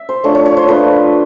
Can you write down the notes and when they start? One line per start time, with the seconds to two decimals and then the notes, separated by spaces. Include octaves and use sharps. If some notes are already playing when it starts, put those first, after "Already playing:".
Already playing: E5
0.09 C5
0.24 F3 A3 D4 F4 C#5
0.35 C#5
0.46 C#5
0.57 C5
0.68 F3 A3 D4 F4 B4